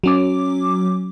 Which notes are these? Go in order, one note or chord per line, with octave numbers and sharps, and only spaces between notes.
F#3 C#4 D6